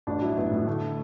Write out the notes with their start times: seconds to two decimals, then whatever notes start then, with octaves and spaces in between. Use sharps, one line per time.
0.07 A1 D4
0.21 F#3 E4
0.37 A1 B3
0.51 A2
0.67 D3 A3